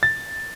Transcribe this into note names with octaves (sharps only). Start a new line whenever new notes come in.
A6